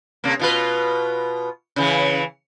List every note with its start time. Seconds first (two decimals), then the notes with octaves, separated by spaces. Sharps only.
0.24 C3 A#3
0.39 B2 F4 B4
1.76 C#3 E3